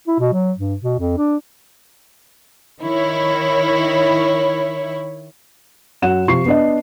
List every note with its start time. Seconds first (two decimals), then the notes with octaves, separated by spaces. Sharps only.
0.08 E4
0.19 B2
0.33 F#3
0.58 G2
0.82 B2
0.99 F2
1.17 D4
2.81 D#3 E4 C#5
6.02 F#2 F#5 E7
6.28 C3 F3 C#6 C7
6.46 B3 D4 D#5